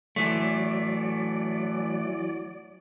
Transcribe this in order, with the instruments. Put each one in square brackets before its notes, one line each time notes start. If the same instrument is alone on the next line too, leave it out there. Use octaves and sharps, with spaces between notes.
[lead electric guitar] E3 A3 [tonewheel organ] F#3 D5